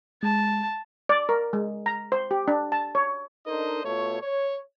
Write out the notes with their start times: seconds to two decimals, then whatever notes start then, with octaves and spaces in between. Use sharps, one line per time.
0.23 G#3 A5
1.09 D5
1.29 A#4
1.53 G#3
1.86 A#5
2.12 C5
2.31 G4
2.48 D4
2.72 A5
2.95 C#5
3.47 D4 D#4 A4 A#4 C5 D#5
3.84 B2 A3 F4 C#5
4.22 C#5